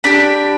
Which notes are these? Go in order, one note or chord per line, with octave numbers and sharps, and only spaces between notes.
D4 G4 B5